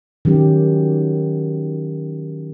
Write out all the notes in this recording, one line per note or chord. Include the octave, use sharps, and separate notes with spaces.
D#3 F#3 C#4 G4